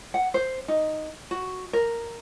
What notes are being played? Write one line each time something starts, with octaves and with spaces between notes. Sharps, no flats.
F#5
C5
D#4
F#4
A#4